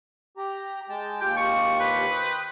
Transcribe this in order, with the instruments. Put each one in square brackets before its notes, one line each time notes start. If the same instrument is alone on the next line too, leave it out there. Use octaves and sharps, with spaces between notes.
[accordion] G4 A#5
G#3 G5 A5
[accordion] D#2 F4 G4 [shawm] G5
[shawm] C#6
B4
[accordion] C5 G5 D#6